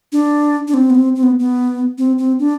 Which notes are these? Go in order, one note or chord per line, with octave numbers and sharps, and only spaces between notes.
D4
D4
C4
B3
C4
C4
B3
B3
C4
C4
D4